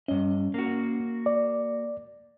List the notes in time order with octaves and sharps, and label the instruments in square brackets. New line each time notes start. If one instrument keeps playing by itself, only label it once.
[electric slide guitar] G2 D#5 [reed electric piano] C#4
[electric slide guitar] A#3 F#4
[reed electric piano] D5